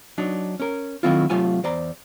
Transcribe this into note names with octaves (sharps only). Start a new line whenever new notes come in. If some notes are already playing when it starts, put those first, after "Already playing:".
F#3 D4 D#4
C#4 A#4
D#3 F#3 A3 C4 E4 F4
C3 F#3 A3 F4 F5 G#5
E2 C5 D5 A#5